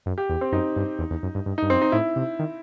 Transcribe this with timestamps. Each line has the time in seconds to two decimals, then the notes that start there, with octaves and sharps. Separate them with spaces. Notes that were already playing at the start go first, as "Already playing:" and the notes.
0.06 F#2
0.18 G4
0.29 E2
0.41 C4
0.52 F#2 D#4
0.76 G2
0.99 E2
1.11 E2
1.23 F#2
1.35 G2
1.46 G2
1.58 G2 D#4
1.70 F#2 C4
1.82 D#4
1.92 A2 E4
2.16 C3
2.39 D#3